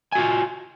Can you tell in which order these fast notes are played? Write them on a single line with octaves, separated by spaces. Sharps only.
G#5 F#4 F4